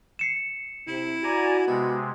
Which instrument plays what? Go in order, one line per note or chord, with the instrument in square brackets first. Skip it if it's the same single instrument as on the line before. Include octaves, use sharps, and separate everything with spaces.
[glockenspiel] C7 C#7 E7
[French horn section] C3 [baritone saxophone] E4
[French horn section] F#4 [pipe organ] D5 G#5 A#5
[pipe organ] C3 G#3 [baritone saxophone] B3